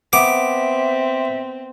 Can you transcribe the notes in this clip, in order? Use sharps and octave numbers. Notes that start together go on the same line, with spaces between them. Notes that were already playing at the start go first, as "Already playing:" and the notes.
B3 C4 E5 D6